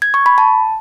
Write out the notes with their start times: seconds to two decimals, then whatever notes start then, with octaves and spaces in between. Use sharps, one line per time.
0.02 G#6
0.14 C#6
0.26 B5
0.38 A5